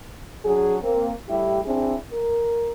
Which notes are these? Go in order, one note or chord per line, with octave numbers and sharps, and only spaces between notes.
F#3 D4 G#4
A#3 C4
A2 G3 E4 G4
C4 D4 E4 G#4
A#4